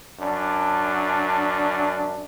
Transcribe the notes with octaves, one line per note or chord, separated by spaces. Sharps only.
F#2 D4